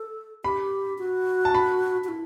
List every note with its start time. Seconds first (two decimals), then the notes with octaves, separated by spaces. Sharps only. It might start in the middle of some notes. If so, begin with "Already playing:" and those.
Already playing: A4
0.44 G4 B5
0.98 F#4
1.45 A5
1.55 B5
2.04 F#4
2.08 E4